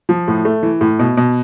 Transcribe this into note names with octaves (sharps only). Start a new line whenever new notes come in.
F3
A2
A3
E3
A2
B2
B2